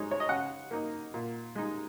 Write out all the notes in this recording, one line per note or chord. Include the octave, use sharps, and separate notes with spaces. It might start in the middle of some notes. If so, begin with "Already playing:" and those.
Already playing: G#3 D#4 C#5
C#5
D#5
C#3 F#5
A#3 D#4
A#2
G#3 D#4